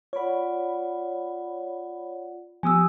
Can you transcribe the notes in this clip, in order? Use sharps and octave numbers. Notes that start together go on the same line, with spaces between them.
F4 C#5 D5 F#5 B5
F3 B3 G4 G#5 D#6 E6